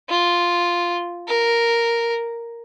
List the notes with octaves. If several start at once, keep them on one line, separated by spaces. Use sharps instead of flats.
F4
A#4